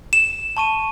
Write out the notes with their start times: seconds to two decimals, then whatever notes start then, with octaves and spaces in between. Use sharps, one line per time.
0.13 E7
0.57 A5 C#6 D#7